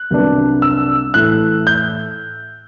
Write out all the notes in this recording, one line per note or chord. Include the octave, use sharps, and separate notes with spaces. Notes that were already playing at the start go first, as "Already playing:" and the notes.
Already playing: F#6
C2 C3 F#3 B3 D4
E6
A2 E3 A3 F#6
G6